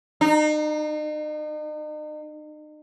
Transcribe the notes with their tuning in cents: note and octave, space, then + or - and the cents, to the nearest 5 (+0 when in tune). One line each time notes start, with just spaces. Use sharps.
D#4 -40